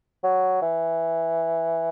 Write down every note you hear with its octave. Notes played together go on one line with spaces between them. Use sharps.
F#3
E3